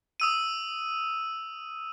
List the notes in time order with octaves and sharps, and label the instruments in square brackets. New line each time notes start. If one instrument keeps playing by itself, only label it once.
[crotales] D#6 E6 D#7